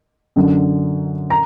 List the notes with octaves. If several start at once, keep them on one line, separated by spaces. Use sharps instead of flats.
F#2 D3 F#3
A#5